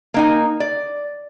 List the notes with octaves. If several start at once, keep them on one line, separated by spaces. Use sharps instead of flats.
A#3 D#4 G#5
D5